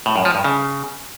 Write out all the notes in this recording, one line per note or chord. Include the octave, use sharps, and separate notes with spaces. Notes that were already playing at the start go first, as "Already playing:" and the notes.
A2
F#2
F3
G2
C#3